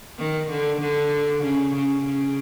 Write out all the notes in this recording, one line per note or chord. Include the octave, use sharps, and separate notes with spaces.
D#3
D3
D3
C#3
C#3
C#3